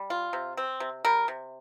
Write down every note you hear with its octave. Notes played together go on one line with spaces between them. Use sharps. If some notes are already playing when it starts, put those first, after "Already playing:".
Already playing: G3
F4
C3
C4
C3
G3 A#4
C3